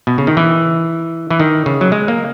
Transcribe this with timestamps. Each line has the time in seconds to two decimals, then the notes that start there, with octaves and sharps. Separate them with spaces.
0.07 B2
0.18 C#3
0.27 D#3
0.37 E3
1.30 E3
1.40 D#3
1.66 C#3
1.81 F#3
1.92 G#3
2.08 A#3